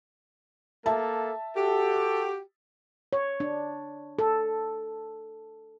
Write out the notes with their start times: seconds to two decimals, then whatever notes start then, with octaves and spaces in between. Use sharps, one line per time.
0.86 A#3 A4 E5 A5
1.57 F#4 G4 A4
3.13 C#5
3.40 D4
4.19 A4